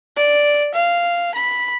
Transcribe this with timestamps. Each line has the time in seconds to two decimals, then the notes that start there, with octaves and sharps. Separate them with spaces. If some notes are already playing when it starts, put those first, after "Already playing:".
0.17 D5
0.74 F5
1.35 B5